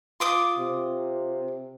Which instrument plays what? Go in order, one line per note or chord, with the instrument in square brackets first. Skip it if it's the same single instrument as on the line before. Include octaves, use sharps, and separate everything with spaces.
[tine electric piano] F4 [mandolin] C6 D6 D#6
[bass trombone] C3